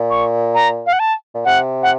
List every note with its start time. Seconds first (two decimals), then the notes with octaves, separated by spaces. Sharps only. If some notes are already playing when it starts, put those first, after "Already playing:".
Already playing: A#2
0.10 C#6
0.55 A#5
0.86 F5
0.93 F#5
0.99 A5
1.35 A#2
1.45 C3 F#5
1.83 F#5